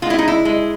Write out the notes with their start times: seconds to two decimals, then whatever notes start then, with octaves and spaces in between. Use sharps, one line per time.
0.02 G#3 F4
0.10 E4
0.19 D#4
0.28 E4
0.45 G#3